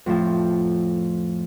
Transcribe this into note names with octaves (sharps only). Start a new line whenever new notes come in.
F2 A2 F3